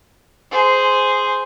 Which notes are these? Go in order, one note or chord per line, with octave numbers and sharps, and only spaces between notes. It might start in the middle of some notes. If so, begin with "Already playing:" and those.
G#4 C5